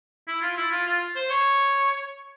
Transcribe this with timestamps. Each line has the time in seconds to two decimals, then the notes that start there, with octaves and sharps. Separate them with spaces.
0.28 E4
0.42 F4
0.58 E4
0.72 F4
0.87 F4
1.16 C5
1.30 C#5